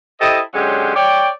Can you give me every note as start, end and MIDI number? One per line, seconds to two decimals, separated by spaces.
0.21 0.41 64
0.21 0.41 67
0.21 0.41 69
0.21 0.41 72
0.21 0.41 75
0.54 0.93 50
0.54 0.93 54
0.54 0.93 56
0.54 0.93 61
0.54 0.93 67
0.54 0.93 72
0.95 1.29 73
0.95 1.29 74
0.95 1.29 79